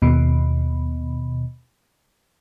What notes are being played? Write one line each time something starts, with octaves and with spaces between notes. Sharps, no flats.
D#2 B2